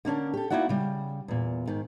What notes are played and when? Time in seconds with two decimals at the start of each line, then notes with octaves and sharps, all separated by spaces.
0.05 D3 A#3 C#4 D4
0.34 G4 A4
0.50 A#3 D#4 E4 F#4 D5 F#5
0.69 C#3 G3
1.28 E2 A#2
1.67 G#2 D#3